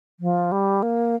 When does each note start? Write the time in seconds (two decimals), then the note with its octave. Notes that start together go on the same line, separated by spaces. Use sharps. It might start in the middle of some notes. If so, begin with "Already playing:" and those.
0.20 F3
0.52 G3
0.83 A#3